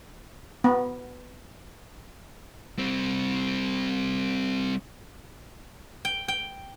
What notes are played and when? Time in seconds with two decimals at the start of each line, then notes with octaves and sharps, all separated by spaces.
0.64 B3
2.78 G3 C4
6.05 G5
6.28 G5